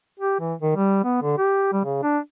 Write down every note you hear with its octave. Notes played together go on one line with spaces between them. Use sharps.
G4
E3
D#3
G3
B3
D3
G4
G3
C#3
D4